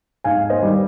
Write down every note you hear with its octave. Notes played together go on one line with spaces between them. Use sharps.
G#2 F5 G#5
C5 D#5
D#3 G3